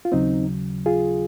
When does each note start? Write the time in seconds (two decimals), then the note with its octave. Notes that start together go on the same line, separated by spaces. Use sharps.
0.05 F4
0.12 D#2 C#3 F#3 C4 D#4
0.86 F4 G#4